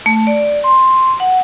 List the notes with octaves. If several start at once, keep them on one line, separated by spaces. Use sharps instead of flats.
A3
D5
C6
F#5